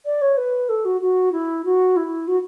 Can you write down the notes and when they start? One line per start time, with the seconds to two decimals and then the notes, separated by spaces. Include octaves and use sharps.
0.05 D5
0.21 C#5
0.37 B4
0.69 A4
0.85 F#4
1.01 F#4
1.32 E4
1.64 F#4
1.96 E4
2.27 F#4